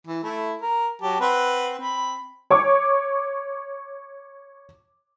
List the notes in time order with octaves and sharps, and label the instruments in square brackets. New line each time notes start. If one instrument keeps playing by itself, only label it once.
[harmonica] E3
A3 E4
A#4
F#3 G4 A5
C4 B4 F#5
C4 B5
[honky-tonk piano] C#5 C#6 D6